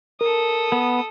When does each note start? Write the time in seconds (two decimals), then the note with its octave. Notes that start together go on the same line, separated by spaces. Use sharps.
0.21 A4 A#4 D#6
0.72 B3